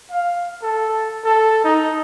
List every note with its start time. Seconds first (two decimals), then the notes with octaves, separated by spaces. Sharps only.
0.10 F5
0.63 A4
1.24 A4
1.64 D#4